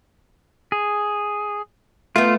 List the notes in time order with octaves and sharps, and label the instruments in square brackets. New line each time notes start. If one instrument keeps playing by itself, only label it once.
[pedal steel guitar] G#4
[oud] A3 B3 [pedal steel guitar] F4